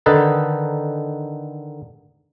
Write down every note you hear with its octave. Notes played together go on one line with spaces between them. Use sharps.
D3 D#3 D#4 A4 B4 A5